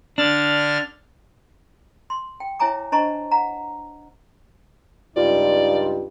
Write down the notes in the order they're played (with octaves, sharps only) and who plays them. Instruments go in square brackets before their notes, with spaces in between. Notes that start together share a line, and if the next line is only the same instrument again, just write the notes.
[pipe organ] D3 F6 A6 [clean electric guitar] D4
[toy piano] C6
G5
E4 C#5 E5 G#5 A#5 D6
D4 C5 D#5 A5 A#5 C#6
F#5 A#5
[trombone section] C#2 D#4 [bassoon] G2 [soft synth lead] F4 [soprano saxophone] D5